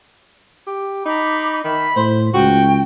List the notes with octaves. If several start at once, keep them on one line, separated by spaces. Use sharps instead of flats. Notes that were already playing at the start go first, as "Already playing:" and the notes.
G4
D#4 A#5 B5 D6
D#3 E5 B5
A2 C5
C#2 F#4 G5